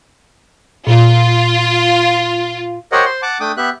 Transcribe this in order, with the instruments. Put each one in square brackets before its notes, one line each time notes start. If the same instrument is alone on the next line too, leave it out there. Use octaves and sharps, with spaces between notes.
[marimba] A#2 [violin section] F4
[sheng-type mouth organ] G4 A#4 C5 C#5 D#5 F#5
C5 C6
F#5 A5 D6
A3 D4 G5 D6 D#6
B3 G4 E5 F#6